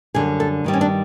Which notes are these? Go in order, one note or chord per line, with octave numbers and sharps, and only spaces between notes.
F#2 D3 G3 G#4
A4
G2 D#3 G3
C#4
D4